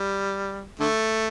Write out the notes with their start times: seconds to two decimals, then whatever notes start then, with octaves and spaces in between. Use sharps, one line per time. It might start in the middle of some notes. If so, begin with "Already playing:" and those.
Already playing: G3
0.79 D3 A3